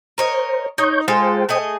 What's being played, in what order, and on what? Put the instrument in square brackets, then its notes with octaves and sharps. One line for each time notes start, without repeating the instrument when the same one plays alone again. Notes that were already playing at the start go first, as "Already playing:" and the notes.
[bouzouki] A#4 C#5 D#5 [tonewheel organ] C5
[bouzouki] D#4 [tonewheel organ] C#5 C#6 G6
[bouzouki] G#3 F4 A4 [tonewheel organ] C5 G5
[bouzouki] A3 G#4 D#5